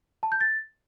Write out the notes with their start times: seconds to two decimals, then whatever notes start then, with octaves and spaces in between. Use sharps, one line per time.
0.23 A5
0.32 G6
0.41 A6